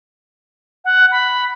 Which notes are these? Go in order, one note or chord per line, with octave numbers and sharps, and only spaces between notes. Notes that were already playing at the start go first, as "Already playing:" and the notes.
F#5
B5